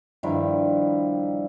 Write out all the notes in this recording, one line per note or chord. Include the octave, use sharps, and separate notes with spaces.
G2 D#3 F3 E4